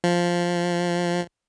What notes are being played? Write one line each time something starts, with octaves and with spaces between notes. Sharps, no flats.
F3